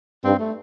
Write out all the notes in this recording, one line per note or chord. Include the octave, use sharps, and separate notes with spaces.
G2 C4
A3